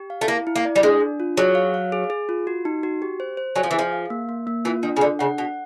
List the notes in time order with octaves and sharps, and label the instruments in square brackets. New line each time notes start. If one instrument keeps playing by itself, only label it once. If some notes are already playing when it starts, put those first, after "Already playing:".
Already playing: [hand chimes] G4
F5
[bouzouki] A3
[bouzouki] A#3 [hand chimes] E4
[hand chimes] E4
[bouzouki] A#3
[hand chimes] D5
[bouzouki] G3
[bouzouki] G#3 [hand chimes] D4
[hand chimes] D4
F4
[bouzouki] F#3 [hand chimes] G#4
[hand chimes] F5
F5
G#4
G#4
F4
F#4
D#4
F#4
G4
C5
C5
[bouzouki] F#3 [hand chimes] G#5
[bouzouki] F3
E3
[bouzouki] F3 [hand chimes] G#4
[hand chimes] F5
A#3
A#3
A#3
[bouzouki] E3 [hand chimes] F4
[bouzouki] D#3 [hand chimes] D4
[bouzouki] C#3
[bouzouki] D3 [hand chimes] D4
[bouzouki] C#3 [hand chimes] F#5
[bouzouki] B2 [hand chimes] F#5